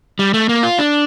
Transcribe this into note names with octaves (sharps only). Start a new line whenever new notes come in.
G3
A3
A#3
F4
D4